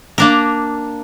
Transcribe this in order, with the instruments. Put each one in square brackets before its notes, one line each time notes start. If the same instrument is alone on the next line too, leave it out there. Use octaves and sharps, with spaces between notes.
[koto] A#3 D4 A#4